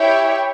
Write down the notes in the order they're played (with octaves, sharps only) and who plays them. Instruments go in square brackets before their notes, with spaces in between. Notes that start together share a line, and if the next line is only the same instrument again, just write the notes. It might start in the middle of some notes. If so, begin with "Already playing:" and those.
Already playing: [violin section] E4 G4 C#5 E5 G5